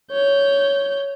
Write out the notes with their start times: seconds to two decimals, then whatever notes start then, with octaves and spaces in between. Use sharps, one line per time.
0.13 C#5 G6